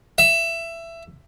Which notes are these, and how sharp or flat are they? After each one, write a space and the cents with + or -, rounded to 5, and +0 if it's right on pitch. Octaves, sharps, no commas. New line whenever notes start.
E5 +20